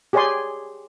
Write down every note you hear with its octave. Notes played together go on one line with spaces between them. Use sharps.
G4 G#4 C#5 D5 G#5 C6